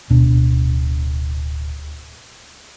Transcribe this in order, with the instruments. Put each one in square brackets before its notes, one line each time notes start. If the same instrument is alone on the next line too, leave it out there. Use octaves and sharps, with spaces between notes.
[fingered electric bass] D1 B2 D4